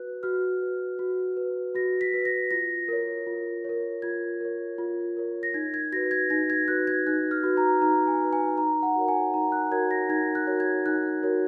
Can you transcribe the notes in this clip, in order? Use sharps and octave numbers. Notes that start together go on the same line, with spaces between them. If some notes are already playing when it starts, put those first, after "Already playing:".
Already playing: F#4 B4 F#6
F#4 F6
B4
F#4
B4
F#4 A#6
B6
B4
A#6
F4 A#6
A#4 C#5
F4
A#4 C#5
F4 G#6
A#4 C#5
F4
A#4 C#5
A#6
D#4 G#6
G#6
F#4 B4 A#6
G#6
D#4 A#6
G#6
F#4 B4 F#6
G#6
D#4 F#6
F6
F#4 B4
A#5
D#4 A#5
G#5
F#4 B4
G#5
D#4 A#5
F#5
F#4 A#4 C#5
G#5
D#4 A#5
F#6
F#4 A#4 C#5 G#6
A#6
D#4 G#6
F#6
F#4 A#4 C#5
G#6
D#4 F#6
F#4 A#4 C#5